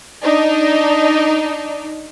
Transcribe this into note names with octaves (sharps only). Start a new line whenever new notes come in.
D4 D#4